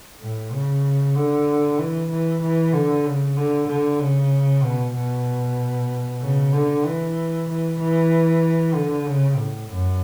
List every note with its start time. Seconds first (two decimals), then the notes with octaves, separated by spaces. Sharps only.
0.21 A2
0.53 C#3
1.15 D3
1.79 E3
2.10 E3
2.42 E3
2.73 D3
3.05 C#3
3.37 D3
3.68 D3
4.00 C#3
4.63 B2
4.95 B2
6.21 C#3
6.53 D3
6.85 E3
7.48 E3
7.79 E3
8.74 D3
9.06 C#3
9.37 A2
9.70 F#2